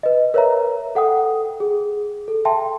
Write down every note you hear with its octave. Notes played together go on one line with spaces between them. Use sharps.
B4 D#5
A#4 B4 C#5 E5 A#5
A4 F#5 G5 D#6
G#4
A4
E5 G5 A5 C6